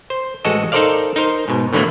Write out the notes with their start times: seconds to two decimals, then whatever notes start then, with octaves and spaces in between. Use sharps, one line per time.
0.10 C5
0.45 A1 G#3 F#4 A4 D#5
0.72 D#4 A4 A#4 C5 D5 F5
1.16 D#4 A#4 C5
1.48 G#2 B2
1.73 A2 D3 E3 F#3 A#3 B3